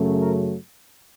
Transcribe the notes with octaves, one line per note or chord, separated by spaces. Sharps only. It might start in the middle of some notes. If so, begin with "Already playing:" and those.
Already playing: F#2 C#3 F#3 A3
A#4